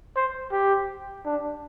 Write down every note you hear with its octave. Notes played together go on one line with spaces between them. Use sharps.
C5
G4
D4